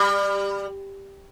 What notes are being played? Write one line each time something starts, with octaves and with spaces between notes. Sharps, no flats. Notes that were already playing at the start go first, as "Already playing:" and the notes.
Already playing: G3